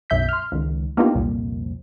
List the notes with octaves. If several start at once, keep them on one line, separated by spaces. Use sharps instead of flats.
B1 F#2 E5 G6 B6
C6 F6
C#2 D#3
A#3 B3 D4 D#4 F4 G4
C2 F2 A#2